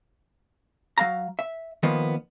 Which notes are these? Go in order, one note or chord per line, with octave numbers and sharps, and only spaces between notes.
F#3 F5 A#5
E5
D#3 F3 A#3 B3